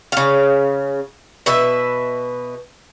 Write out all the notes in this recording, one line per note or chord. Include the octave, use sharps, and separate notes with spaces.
C#3 F5
B2 B4 E5